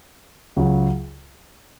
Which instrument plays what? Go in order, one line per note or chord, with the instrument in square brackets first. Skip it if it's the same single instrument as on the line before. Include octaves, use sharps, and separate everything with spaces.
[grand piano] C#2 C#3 F#3